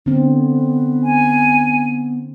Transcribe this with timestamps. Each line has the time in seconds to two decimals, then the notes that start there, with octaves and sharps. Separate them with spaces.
0.06 D3 B3 C4
1.03 G#5